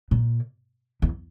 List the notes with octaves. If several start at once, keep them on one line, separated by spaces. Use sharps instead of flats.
A#2
E2